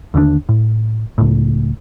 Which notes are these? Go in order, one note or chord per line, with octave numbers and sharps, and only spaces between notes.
D#2 D3 D#3 D4
A2
C#2 A2